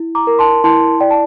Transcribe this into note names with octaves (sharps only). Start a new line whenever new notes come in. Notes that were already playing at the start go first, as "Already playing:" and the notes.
Already playing: E4
A#5 D6
A#4
A5 C6
E4 A5 C6
D5 G5
A5